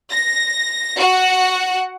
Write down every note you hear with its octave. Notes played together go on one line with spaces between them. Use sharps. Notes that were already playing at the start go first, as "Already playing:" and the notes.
A#6
F#4 F#5